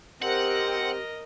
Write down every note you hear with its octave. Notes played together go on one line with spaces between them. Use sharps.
C4 G4 A#4 D#5 F#5